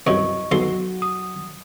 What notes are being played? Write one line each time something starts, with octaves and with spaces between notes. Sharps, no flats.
C2 F#2 D#5 C#6
B1 F#3 F#4 A4 C6
D#6